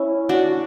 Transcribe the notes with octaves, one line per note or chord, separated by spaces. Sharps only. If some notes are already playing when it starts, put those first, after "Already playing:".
Already playing: C#4 E4
D4 F#4